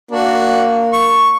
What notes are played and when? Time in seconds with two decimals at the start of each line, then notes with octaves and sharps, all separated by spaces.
0.11 A#3 D4 F#4
0.93 C#6